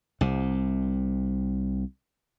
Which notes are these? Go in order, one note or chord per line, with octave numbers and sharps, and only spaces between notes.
C2 C3